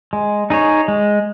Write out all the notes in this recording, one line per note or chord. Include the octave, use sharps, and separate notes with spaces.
G#3
D#4 G#4 C#5
G#3